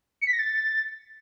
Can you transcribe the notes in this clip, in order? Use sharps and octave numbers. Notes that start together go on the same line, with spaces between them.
C#7
B6
A#6
A6